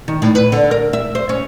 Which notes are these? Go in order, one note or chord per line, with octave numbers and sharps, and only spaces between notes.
D#3
A2
B4
D3
A#4
E5
C5
C#4